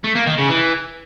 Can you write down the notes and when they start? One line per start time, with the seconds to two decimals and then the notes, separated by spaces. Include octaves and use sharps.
0.04 A3
0.15 A#3
0.27 D#3
0.38 C#3
0.50 E3